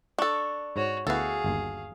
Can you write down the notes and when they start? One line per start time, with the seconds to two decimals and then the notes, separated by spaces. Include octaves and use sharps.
0.18 D4 A4 C#6
0.76 G#2 F#4 C#5
1.07 D2 B3 E4 F#4 G#4 A4 F5
1.44 G1 D#2